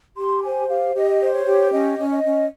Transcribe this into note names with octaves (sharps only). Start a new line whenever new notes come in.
G4 C6
C5 G#5
G4 F5
G4 D#5
C5
C#5
G4
C#4 D#5
C#4
D#5
C#4